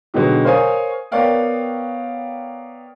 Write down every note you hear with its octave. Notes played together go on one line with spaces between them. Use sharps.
B2 D3 F#3 G#3 D#4 G4
A#4 C5 C#5 F5 G#5 D#6
B3 A#4 C#5 D5 F5 G5